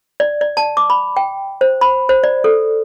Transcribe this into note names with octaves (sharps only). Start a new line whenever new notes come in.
D5
D5
A5
D6
B5
G5
C5
B5
C5
D5
A4